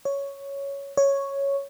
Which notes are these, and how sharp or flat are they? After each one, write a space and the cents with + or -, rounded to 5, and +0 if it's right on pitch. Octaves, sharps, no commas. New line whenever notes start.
C#5 +5
C#5 +0